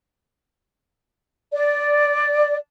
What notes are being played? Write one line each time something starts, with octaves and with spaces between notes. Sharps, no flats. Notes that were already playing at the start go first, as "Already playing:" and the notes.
D5